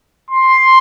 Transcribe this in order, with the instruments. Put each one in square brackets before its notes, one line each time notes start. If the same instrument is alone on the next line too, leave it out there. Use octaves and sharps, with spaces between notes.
[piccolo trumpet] C6